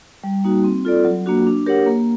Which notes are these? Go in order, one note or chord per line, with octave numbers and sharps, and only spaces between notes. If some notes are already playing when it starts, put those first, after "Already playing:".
G3
A#3 D#4 F#4
C4
F4 A4 D5
F#3
A#3 D4 F#4
D4
G4 A#4 C#5 F#5
A#3